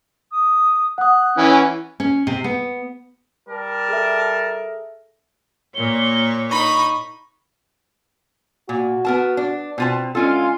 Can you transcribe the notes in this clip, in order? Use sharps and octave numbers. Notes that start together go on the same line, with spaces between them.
D#6
F#5 D#6 F#6
E3 C#4 C#6
F#5
C#4
C3
B3
G3 A#4 A5
G#4 A4 E5
A#2 A#3 C#5 G7
D#4 B5 C#6
A#2 F#4
B3 A#4 A5
D4
B2 C4 F4 A5
D3 G#3 C#4 F4 A4